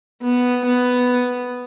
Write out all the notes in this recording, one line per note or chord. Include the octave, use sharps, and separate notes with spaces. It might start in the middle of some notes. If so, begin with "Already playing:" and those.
B3
B3